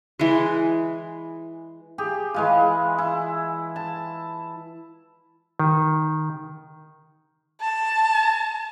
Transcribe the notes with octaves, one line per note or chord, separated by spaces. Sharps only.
E3 G#3
G4 G#4
E3 G#3 F4
E4
A5
D#3
A5